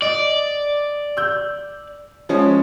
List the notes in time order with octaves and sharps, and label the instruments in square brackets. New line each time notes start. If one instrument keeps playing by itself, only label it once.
[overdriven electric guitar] D5 [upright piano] D#5
[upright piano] E6 G6
F3 G#3 C#4